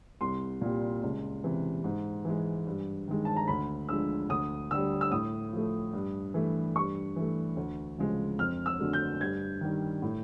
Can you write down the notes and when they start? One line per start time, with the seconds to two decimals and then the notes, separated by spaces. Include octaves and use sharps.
0.21 C2 C6
0.61 A#2 G3
1.03 C#2
1.44 C3 E3
1.84 G#2
2.25 E3 G#3
2.67 G2
3.08 D#3 G#3
3.25 A5
3.37 A#5
3.48 D2 B5
3.89 D3 F3 G#3 E6
4.29 D2 D#6
4.71 D3 G3 E6
5.01 E6
5.12 A2 D#6
5.53 F3 A3
5.93 G2
6.34 E3 A3
6.76 G2 C#6
7.16 E3 A3
7.57 D2
7.98 C#3 F3 G#3
8.39 F2 F6
8.66 E6
8.79 D3 F#3 A3
8.93 G6
9.20 G2 G#6
9.61 D#3 G3
10.02 A2